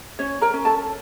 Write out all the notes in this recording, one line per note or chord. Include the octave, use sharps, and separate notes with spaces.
C#4 C#5
A#4 A#5
C#4
A4 A5